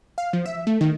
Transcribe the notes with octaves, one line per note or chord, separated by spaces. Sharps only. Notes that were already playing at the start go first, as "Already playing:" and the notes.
F5
F3
E5
A3
D#3